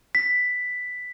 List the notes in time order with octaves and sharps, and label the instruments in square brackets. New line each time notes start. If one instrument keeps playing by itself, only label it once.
[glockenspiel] B6